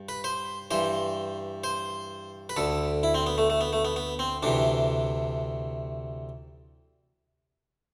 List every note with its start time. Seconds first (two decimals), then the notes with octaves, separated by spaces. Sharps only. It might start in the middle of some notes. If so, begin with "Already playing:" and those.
Already playing: G2
0.09 B4
0.24 C5
0.71 G2 E3 C5
1.64 C5
2.49 B4
2.57 D2 D3 A4
3.03 E4
3.14 C4
3.26 B3
3.38 A3
3.50 A3
3.61 B3
3.73 A3
3.85 B3
3.96 B3
4.19 C4
4.43 D2 C3 E3 D4